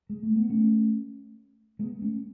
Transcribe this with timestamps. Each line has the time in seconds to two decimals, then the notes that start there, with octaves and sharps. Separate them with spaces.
0.09 G#3
0.23 A3
0.36 B3
0.49 A3 C#4
1.79 G#3 B3
2.01 A3 C#4